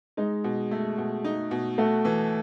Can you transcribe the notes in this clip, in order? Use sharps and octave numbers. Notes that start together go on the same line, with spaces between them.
G#3 D#4
B2
A3
B2
D#4
B2
A3 F#4
E3